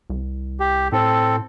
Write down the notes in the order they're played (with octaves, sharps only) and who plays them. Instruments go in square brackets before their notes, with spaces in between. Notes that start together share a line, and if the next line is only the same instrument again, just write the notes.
[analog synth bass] C2
[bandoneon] G4
[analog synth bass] A2 [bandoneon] C4 A4